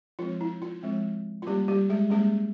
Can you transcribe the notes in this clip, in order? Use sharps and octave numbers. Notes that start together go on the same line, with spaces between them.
F3 G#3 C4 F4
E4
F4
F3 G#3 C4
F4
G3 A#3 C#4 G4
G3 G4
G#3 G#4
G3 G#3 A#3 C#4 G#4